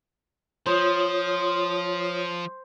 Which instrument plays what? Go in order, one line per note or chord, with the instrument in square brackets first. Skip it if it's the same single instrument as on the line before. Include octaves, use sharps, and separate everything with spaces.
[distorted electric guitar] F3 [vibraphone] F4 C#5 D#6 [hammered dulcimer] C5